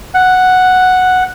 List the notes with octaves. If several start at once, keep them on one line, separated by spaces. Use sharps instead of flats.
F#5